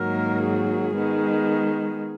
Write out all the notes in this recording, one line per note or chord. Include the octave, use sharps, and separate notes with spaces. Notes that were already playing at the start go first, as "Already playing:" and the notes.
Already playing: G#2 D#3 F#3 A#3 A#4
G#4
D#3 G#3 B3